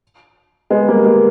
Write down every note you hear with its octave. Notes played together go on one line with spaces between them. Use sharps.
G#3 B3
G3 A#3
G3 A#3